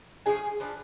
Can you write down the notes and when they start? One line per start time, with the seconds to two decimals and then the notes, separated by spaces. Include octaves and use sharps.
0.26 F3 A3 D4 G#4 G#5
0.60 F3 B3 D4